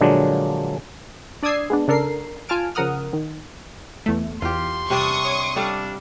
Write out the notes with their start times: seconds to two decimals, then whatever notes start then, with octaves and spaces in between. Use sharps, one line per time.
0.01 A#2 D3 F3 F#3 G#3 D4
1.43 D4 D5 D#6 E6 G#6 C7
1.70 G#3 B3 D4
1.88 C#3 D4 A4 A#4 C7
2.49 F4 G#5 A5 F6 D7
2.75 C#3 F3 A#4 F#5 D#6 F6
3.13 D#3
4.06 E2 A3
4.42 E2 F4 G4 C6
4.90 C3 G3 D4 C#6 D#6
5.25 C#5
5.56 G3 D4 A4 F5